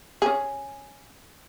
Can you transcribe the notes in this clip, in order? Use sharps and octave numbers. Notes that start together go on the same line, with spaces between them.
C#4 G#4